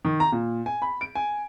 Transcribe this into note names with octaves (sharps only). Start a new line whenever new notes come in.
D#3
A#5
A#2
G#5
B5
D7
G#5